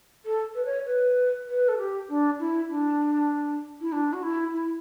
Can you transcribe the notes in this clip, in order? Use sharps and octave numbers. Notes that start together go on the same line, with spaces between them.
A4
B4
C#5
B4
B4
A4
G4
D4
E4
D4
E4
D4
F#4
E4
E4